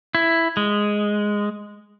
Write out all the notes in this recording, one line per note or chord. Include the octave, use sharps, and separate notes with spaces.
E4
G#3